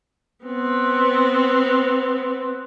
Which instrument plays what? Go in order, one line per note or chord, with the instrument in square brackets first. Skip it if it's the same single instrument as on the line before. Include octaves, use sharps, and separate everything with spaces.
[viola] B3 C4